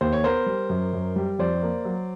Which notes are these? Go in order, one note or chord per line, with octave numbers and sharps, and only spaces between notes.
D#2 C5
C#5
B3 A#4 C5
G3
F#2
F#2
G3
F2 C5 D5
A#3
F#3